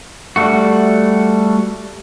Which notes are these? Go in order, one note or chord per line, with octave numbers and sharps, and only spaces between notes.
G3 A3 F#4